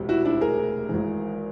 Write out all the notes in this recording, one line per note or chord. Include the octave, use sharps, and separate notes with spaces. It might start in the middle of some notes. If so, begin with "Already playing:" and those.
Already playing: E1 D2 C3
E4 F#4
D4 E4
G#4 A#4
G#1 G#2 E3